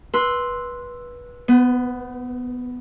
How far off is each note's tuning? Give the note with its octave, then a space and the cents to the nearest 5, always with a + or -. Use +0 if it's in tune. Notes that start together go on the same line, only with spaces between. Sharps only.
B4 -20 C6 +0 E6 +0
B3 +5 C5 -45